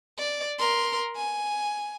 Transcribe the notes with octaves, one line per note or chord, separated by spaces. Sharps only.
D5
A#4 C6
G#5